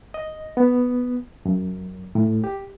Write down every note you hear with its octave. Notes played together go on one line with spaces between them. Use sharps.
D#5
B3
F#2
A2
G4